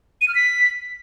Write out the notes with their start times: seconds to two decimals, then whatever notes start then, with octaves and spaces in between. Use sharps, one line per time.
0.21 D#7
0.28 F6
0.35 B6